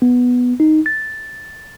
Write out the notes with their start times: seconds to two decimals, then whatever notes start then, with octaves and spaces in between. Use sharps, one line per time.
0.02 B3
0.60 D#4
0.86 A6